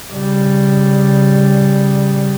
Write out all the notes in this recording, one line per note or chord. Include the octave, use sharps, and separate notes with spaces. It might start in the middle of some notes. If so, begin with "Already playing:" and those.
C#3 G3